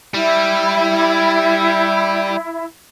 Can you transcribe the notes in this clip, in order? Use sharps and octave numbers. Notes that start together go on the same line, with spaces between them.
G3 E4